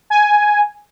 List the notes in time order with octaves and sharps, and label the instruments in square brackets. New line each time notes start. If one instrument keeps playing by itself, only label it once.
[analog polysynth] G#5